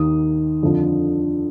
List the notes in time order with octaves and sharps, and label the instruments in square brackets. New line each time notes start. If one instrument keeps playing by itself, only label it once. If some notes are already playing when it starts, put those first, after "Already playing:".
Already playing: [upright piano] D#2 D#3 D#6
F2 D3 F3